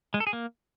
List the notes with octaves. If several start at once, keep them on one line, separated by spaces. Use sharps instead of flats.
G#3
A4
G#4
A#3